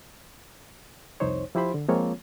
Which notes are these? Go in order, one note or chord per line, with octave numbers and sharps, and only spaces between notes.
C2 F2 D#4 C5 C#5
F3 E4 G4 C5 B5 C6
D3
F3 G#3 A#3 C4 F4 C#5